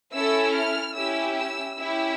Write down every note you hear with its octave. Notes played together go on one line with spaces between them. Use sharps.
C#4 E4 A4 E6
F6
C#4 E4 G4 E6
E6
C#4 E4 G4 E6